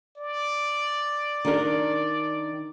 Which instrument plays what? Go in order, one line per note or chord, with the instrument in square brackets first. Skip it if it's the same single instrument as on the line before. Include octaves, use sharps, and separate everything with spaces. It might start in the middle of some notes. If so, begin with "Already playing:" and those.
[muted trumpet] D5
[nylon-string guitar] D#3 D4 A#4